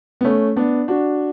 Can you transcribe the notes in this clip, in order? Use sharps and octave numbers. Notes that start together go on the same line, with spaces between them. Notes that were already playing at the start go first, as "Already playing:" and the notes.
B3
A3 C#4
B3 D4
D4 F#4